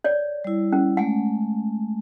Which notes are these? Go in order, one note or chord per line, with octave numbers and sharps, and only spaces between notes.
C#5 D5
G3 E4
C#4
G#3 A3 F#5